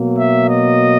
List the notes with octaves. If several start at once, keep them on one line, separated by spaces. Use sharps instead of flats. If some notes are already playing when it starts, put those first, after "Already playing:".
Already playing: B2 F#3 A#3
E5
D#5